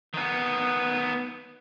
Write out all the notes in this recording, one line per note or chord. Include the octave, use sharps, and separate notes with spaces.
D#3 B3